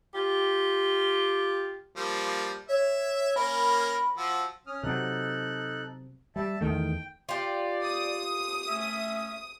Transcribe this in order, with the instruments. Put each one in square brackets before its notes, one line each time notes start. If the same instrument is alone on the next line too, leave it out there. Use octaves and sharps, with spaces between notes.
[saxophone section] F4 G4
[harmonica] F3 G3 A#3
[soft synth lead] C#5 [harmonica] E5
[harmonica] A#3 C#4 A#4 [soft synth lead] B5
[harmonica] F3 F#4 [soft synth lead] E6
[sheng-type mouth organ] C#4 D#6 F6
[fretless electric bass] C3 F#3 [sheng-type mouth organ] D#4 A4 F#6
[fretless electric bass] G3 [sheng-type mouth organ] E5 A5
[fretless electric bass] E2 D#3 A3 [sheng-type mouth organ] G5
[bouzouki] F4 G4 [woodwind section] D5
[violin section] D#6
[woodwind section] A3 C#4 E5